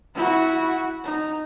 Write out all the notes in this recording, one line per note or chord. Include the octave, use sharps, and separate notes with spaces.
E4 F#4
D#4